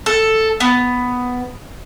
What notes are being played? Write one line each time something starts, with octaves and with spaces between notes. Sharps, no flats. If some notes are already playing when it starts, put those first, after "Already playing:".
A4
B3